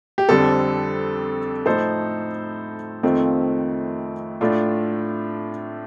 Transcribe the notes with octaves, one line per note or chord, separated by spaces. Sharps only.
G4
F2 D3 G3 C4 A4
A2 F3 A3 D#4 A4 C5
F2 D#3 A3 C4 F4
A2 A3 D4 F4